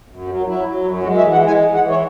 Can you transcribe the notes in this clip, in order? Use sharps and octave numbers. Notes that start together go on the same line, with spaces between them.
F#2
F#3
F#3 E4
F#3
F#2
G#3 F#4
E5
E3
F#5
G#3
G#5
E3
F#5
E3
C#5